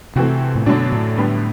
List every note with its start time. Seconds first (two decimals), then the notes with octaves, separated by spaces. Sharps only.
0.16 C3 E3 A3 C4 F#4
0.55 A2
0.66 F#2 B2 D3 F#3 A3 D4
0.92 A2
1.17 D3 G3 B3